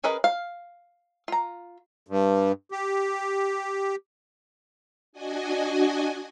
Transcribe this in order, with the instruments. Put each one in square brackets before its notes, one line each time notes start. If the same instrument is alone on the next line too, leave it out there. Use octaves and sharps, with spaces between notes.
[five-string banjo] C#4 G#4 A#4 B4 D#5
F5
F4 A#5
[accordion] G2
G4
[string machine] D4 F#4 D#5 G#5